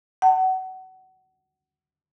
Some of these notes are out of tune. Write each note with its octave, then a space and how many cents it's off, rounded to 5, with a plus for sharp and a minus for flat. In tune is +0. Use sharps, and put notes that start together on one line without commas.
F#5 +25 A5 +25